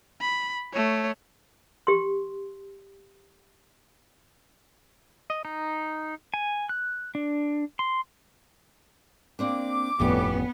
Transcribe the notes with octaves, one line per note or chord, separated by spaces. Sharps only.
B5
A3 C#5
G4 C6
D#5
D#4
G#5
F#6
D4
C6
A#3 C4 D4 D6
G1 F2 A2 G3 B3 C#4